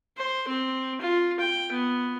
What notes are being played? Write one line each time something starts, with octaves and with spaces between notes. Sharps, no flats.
C5
C4
F4
G5
B3